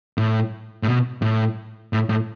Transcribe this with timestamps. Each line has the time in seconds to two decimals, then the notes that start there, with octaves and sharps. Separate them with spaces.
0.18 A2
0.83 A2
0.87 B2
1.22 A2
1.93 A2
2.09 A2